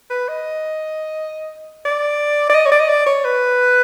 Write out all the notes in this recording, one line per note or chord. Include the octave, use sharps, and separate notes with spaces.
B4
D#5
D5
D5
D#5
C#5
D5
D#5
D5
C#5
B4